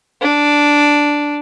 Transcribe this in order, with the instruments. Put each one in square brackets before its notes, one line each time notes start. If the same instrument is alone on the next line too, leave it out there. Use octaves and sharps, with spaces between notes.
[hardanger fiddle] D4